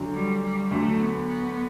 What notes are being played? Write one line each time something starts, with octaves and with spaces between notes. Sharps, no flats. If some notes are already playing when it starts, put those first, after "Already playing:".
Already playing: D2 D3 F#3
G3
G3
D2 D3 F#3 A3
B3
B3